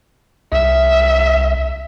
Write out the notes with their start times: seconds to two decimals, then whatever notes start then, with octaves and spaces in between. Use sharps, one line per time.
0.52 C2 E5